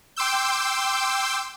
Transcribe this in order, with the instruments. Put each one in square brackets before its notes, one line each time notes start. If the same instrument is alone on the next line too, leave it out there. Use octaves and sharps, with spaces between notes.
[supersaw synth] G5 C6 D6 E6 G6